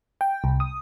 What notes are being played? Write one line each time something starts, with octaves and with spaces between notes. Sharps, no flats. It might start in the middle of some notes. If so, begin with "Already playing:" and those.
G5
C2
D#6